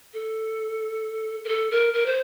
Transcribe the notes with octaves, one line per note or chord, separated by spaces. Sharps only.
A4
A#4
A4
A#4
A#4
C5